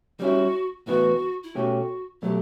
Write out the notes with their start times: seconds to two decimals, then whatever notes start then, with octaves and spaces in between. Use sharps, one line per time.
0.20 G3 C#4 E4 F#4
0.87 A2 E3 B3 F#4
1.43 E4
1.55 B2 A3 C#4 F#4 G4
2.22 B2 F#3 A3 G4